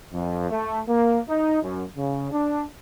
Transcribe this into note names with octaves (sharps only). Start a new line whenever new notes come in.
F2
A3
A#3
D#4
F#2
C#3
D4